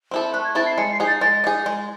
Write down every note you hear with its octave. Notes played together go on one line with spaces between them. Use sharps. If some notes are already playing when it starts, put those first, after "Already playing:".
C4 E4 A4
A3 F#6
G#6
C4 E4 A4 A6
C7
G#3 C#7
C7
D#4 G#4
A6
G#3 A6
D#4 G#4
G#3